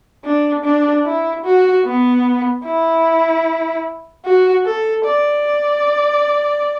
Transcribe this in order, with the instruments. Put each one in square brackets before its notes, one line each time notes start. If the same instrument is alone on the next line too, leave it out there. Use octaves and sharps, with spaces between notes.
[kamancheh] D4
D4
E4
F#4
B3
E4
F#4
A4
D5